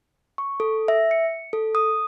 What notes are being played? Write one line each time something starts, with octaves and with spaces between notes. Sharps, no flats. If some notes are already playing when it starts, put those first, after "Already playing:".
C#6
A4
E5
C#7
A4
D#6